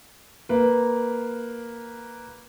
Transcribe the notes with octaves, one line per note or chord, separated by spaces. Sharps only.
A#3 B4